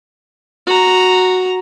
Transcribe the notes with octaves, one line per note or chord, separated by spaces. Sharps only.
F#4 A#5